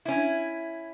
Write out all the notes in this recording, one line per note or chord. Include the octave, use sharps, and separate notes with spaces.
C#4 E4